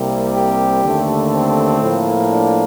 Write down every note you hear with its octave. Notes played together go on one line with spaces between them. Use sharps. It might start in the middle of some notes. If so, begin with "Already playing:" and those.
Already playing: C2 C3 G3 A#3
G4
D#2 D3 A3
C4
A2 F3 A#3
D4